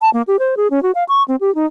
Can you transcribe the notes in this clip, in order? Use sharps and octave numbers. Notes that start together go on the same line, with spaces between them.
A5
A#3
G4
C5
G#4
C#4
F#4
F5
C#6
C4
G4
D#4